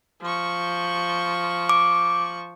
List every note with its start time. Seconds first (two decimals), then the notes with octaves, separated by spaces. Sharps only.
0.22 F3 C#6
1.69 D6